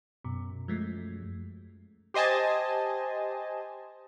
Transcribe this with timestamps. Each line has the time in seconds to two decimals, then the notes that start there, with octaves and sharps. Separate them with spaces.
0.24 F#2 B2
0.68 F3 G#3 A3
2.14 G4 C5 D#5 G#5 A5